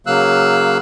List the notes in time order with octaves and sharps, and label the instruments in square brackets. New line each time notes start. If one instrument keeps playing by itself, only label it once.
[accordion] C#3 F#3 A#3 F5 E6 F#6